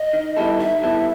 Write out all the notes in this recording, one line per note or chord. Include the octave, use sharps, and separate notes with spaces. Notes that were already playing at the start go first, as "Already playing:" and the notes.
Already playing: D#5
D#3
G3 B3 E4 A4
D#3 E5
G3 B3 E4 A4